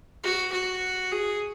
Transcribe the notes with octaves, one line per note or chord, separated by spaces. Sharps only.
F#4
F#4
G#4